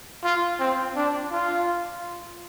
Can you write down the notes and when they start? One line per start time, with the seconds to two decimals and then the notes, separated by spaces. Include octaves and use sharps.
0.24 F4
0.59 C4
0.96 D4
1.31 F4